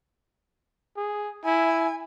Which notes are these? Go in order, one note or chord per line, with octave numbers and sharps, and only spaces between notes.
G#4
E4 G#5